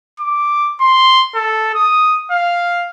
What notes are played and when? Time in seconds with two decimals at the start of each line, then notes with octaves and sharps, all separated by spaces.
0.20 D6
0.81 C6
1.35 A4
1.74 D#6
2.31 F5